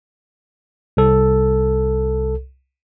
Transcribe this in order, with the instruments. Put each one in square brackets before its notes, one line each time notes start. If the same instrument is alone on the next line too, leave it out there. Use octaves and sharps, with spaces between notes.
[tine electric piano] C2 A4